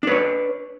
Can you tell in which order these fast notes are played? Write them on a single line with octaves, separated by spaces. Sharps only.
D4 B4 C#5